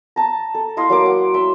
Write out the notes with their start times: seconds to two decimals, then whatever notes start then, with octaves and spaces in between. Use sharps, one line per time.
0.16 A5 A#5
0.55 A4
0.77 E4 D#5 F5 C6
0.90 F#3 A#3 D6
1.06 F#5
1.34 E5 C6